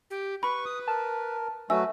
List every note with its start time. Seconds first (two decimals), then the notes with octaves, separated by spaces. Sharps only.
0.10 G4
0.43 B4 B5 C#6
0.65 D#6
0.88 A#4 A5
1.70 F#3 A3 F#4 B4 E5 G#5 E6